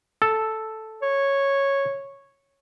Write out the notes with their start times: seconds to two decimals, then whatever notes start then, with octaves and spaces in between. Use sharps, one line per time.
0.22 A4
1.02 C#5